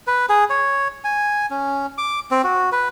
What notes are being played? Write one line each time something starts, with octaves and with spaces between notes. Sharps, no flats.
B4
G#4
C#5
G#5
C#4
D6
C4
F#4
B4